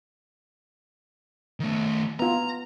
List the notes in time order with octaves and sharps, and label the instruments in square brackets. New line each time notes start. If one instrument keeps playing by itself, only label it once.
[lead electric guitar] D#3 A3
[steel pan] B3 F4 [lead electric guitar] A#5